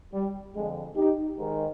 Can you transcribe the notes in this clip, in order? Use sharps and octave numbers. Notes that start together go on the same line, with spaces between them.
G3
F2 D3 G#3
D#4 G4
G#2 D#3